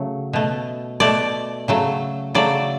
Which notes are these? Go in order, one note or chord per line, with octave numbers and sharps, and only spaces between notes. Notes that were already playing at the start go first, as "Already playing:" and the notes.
Already playing: C#3 F#3 A3
B2 A3
B2 A3 D5
C#3 F#3 A3
C#3 F#3 A3 D5